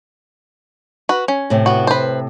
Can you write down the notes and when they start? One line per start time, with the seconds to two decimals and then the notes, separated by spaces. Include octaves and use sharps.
1.09 F#4 B4
1.28 C#4
1.50 A2 C3
1.66 B3 F#4
1.87 B4 C5